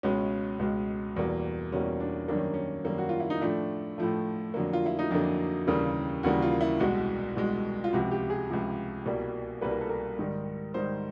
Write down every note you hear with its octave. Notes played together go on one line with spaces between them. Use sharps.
C#2 B2 G#3 C#4
C#2 B2 G#3
E2 B2 G3 A#3
E2 B2 G3 A#3 C#4
D4
F#2 D#3 G3 A#3 D4
C#4
C#4
F#2 D#3 G3 A#3
F#4
F4
E4
D#4
A2 F3 A3 D4
A2 F3 A3
F2 D3 F#3 A#3
F4
E4
D#4
F2 D3 F#3 A#3 D4
D#2 C#3 E3 G3 A#3
D#2 C#3 E3 G3 A#3 F#4
F4
E4
C2 B2 G#3 F#4
C2 B2 G#3
F4
C#2 C3 F3 F#4
G4
G#4
C#2 C3 F3
C2 B2 G3 A#3
C2 B2 G3 A#3 B4
A#4
A4
A#4
G#2 D#3 G3
G#2 D#3 G3 C5